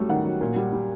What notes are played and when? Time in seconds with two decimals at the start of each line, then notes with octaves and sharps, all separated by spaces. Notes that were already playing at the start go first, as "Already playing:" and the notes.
Already playing: F#3 G3 A3
0.09 D#3 F#5
0.24 F#3
0.41 A#2
0.56 G3
0.72 G3